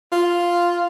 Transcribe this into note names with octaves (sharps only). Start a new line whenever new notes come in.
F4